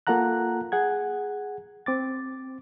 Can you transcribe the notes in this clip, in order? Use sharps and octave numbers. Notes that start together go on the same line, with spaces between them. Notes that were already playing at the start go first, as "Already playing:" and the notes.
A#3 F4 A4 F#5 A#5 F#6
G#4 F#5 G#6
C4 D6 A6